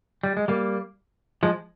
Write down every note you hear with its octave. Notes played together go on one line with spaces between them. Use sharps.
G3
G#3
G3 A#3
F3 G#3